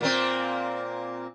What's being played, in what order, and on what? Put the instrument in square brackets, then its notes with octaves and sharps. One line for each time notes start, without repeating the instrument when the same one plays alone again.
[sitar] A#2 A#3 C4